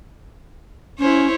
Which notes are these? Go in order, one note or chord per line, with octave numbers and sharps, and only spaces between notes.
C#4 E4 C5 C#5